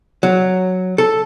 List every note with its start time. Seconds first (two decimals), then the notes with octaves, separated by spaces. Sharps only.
0.23 F#3
0.98 A4